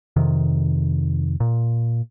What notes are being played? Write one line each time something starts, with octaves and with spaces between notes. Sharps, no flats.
F2 C3 D#3
A#2